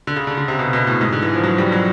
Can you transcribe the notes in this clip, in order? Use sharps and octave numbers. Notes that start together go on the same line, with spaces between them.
D3
C#3
D3
D3
C3
B2
B2
A2
G#2
D3
E3
F3
F#3
G3
F#3